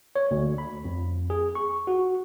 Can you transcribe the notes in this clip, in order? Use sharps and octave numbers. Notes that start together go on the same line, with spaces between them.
C#5
D2
B5
F2
G#4
C#6
F#4